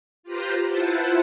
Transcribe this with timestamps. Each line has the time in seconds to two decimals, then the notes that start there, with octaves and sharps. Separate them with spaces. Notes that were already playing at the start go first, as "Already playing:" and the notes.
0.23 F4 G4 B4 C5 A#5
0.65 E4 F4 B4 C5 F#5 A5